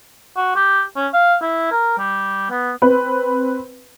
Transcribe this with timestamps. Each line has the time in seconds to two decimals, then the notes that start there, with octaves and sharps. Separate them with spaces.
0.37 F#4
0.56 G4
0.96 C#4
1.14 F5
1.42 E4
1.71 A#4
1.98 G3
2.50 B3
2.82 C4 B4